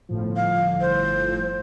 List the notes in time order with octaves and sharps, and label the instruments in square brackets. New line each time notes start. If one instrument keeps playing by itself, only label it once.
[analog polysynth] G1 A2 F3
[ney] F5
C5